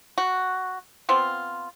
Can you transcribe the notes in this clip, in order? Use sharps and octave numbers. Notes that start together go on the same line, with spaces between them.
F#4
B3 C4 F4